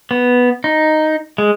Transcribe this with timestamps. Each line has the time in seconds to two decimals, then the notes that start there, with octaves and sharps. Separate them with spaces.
0.11 B3
0.64 D#4
1.38 G#3